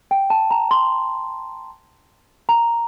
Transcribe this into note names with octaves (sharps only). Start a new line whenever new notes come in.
G5
A5
A#5
C6
A#5